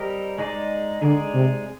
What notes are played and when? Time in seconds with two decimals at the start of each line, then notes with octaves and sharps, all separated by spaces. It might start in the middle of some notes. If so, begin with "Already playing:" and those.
Already playing: G3 C4 G4 A#4 D#5
0.38 G#3 D#4 G#4 D5
1.01 D3 G#3 D#4 G#4 D5
1.34 C3